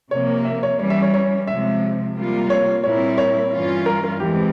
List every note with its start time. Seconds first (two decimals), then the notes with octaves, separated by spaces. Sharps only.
0.11 C3 F3 A#3 C#5
0.45 E5
0.63 C#5
0.79 E3 G3 C#4 C#5
0.90 E5
1.02 C#5
1.14 C#5
1.47 C3 F3 G#3 E5
2.15 C3 G3 A#3 F4
2.50 C#5
2.84 A#2 G3 C4 E4 A#4 C#5
3.18 C#5
3.52 G2 E3 G3 C#4 F4
3.86 A#4
4.04 A#4
4.20 E2 E3 G#3 C4 G4